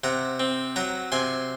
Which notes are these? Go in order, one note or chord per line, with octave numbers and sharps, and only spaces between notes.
C3 F#5 A#5
C4
F#3 F#5 A#5
C3 G#5 C6